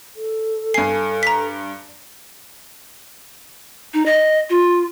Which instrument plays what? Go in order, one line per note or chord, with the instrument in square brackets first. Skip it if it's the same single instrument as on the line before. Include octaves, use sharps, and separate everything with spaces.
[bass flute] A4
[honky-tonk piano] G2 G#5 [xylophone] C7
[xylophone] A#5 B6
[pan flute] D#4
D#5
F4